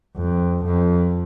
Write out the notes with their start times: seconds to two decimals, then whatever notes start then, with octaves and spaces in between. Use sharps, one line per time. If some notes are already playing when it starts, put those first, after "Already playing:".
0.17 F2
0.64 F2